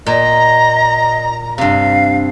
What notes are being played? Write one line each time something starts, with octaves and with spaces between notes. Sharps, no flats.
A#2 D#5 A#5
G2 C3 F5